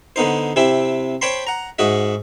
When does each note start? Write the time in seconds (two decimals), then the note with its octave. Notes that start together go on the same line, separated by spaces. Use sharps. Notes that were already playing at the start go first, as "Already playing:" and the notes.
0.16 D3 B3 D#4 C5
0.56 C3 C4 E4 G4 E5
1.21 C5 C#5 G5 A5 B5 C6
1.47 F#5 A#5
1.79 G#2 F#4 D#5 E5